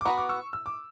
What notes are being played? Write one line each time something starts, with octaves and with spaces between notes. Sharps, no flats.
D6
B3 F#4 B4 A#5 C#6
D6
C#6 E6
E6
D6